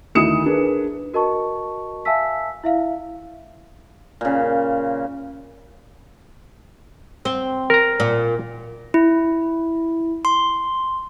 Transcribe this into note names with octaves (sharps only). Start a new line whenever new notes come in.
D2 D#3 E4 D#6 C#7 E7
D4 G#4 A#4 B4
F#4 A#4 D#5 A5 C#6
E5 F5 G#5 A5 E6 B6
E4 E5 F5
A#2 C#3
C4
A#4 A#5
A#2
E4
C6